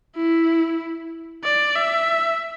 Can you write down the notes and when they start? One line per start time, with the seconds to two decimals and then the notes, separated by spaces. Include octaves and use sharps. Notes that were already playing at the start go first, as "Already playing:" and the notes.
0.16 E4
1.44 D5
1.75 E5